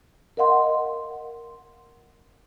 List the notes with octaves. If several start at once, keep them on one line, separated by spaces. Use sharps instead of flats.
A#4 D#5 F5 F#5 C6